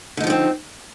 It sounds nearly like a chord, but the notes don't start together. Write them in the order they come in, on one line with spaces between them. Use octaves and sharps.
D3 D#4 F3 G3 C4